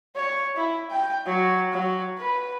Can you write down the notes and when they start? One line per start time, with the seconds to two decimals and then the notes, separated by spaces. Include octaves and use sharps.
0.15 C#5
0.57 E4
0.90 G5
1.26 F#3
1.72 F#3
2.18 B4